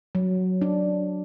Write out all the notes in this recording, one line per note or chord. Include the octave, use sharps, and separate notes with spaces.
F#3
D4